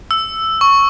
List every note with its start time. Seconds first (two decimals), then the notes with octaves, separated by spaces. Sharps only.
0.11 E6
0.61 C#6